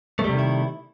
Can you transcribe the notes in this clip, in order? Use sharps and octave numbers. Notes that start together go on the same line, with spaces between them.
C3 D#3 G3 A3 E4